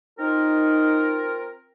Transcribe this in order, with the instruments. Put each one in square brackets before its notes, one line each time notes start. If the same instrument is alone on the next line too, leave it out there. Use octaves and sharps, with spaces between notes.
[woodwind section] C4 F4 A#4 [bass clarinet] D#4